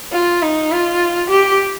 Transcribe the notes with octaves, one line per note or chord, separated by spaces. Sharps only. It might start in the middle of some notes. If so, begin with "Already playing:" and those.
F4
D#4
F4
G4